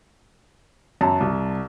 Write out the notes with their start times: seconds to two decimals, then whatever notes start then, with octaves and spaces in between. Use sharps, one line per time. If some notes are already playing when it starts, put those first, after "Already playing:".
1.01 F#2 A5
1.20 C2